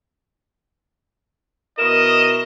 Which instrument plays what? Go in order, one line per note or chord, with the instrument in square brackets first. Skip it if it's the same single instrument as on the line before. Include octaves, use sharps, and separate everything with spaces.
[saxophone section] B2 E4 A#4 [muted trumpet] D#5 [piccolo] E7